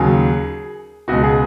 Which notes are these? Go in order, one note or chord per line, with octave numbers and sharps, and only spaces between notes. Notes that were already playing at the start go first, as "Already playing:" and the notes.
Already playing: D#2 C#3 F#3 G#4
C#2 B2 G#3 F#4
G#4